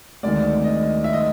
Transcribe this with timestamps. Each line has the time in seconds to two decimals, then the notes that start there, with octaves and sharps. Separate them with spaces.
0.23 D2 C3 D#3 G#3 D5
0.64 D#5
1.04 E5
1.13 D#5